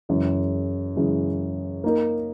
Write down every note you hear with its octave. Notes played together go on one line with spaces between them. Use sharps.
F#2 C#3 E3 G#3
F#2 C#3 E3 G#3
A#3 D#4 A#4